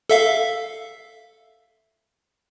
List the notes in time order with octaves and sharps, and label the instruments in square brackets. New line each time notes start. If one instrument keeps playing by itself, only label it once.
[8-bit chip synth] A4 E5 F5